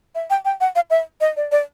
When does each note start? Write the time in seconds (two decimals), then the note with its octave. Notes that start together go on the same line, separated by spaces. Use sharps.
0.15 E5
0.30 G5
0.45 G5
0.60 F#5
0.75 F5
0.90 E5
1.21 D#5
1.36 D5
1.52 D5